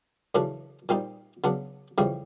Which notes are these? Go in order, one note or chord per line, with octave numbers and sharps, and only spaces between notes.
F#2 C#3 E3 A3 D4
A#2 G3 C4 D#4
C#3 F#3 B3 D4
F2 C#3 E3 G3 C4